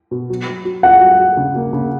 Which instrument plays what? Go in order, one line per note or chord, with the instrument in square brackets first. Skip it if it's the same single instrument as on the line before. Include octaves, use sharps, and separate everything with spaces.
[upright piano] B2
F#3
F#3
F#3
[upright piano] F4 [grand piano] F#5
[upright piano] F#3
F#3
C#3
A#3
C#3